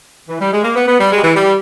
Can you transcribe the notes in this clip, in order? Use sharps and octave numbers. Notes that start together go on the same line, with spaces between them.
E3
G3
G#3
A#3
B3
B3
G3
G#3
G3
E3
G3